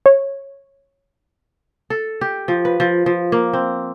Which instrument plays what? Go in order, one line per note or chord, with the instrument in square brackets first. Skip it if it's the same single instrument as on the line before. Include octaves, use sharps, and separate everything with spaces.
[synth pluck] C#5
[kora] A4
G4
F3
B4
F3
F3
A#3
C4